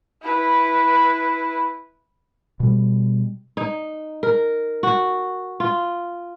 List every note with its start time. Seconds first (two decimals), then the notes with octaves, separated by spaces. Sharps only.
0.22 E4 B4
2.60 B2 G3
3.57 D#4
4.23 A#4
4.83 F#4
5.60 F4